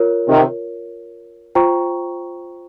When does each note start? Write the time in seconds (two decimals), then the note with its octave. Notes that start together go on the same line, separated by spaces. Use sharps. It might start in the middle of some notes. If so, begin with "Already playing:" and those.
Already playing: F4 A#4 C#5
0.28 C3 D#3
1.55 F4 C5 G5 A#5 C#6